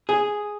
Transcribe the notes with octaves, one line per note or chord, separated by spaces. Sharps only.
G#4